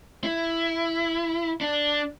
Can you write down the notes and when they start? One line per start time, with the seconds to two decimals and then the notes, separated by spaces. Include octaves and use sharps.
0.24 E4
1.61 D4